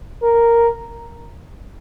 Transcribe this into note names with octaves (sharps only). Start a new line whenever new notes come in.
A#4